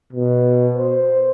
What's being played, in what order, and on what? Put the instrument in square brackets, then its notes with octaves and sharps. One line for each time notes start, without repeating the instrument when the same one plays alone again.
[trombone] B2
C5